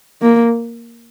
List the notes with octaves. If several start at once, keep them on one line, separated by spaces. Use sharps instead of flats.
A#3